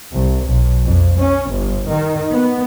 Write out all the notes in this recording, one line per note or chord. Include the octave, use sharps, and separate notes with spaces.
C2
B1
F2
C#4
G1
D#3
B3